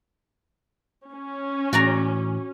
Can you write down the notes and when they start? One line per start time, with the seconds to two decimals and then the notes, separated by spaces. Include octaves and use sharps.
1.12 C#4
1.73 A2 E3 F#4 D5 A#5